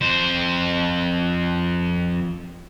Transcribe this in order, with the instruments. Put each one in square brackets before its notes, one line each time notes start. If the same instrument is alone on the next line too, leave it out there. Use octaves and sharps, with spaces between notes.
[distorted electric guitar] F2 C5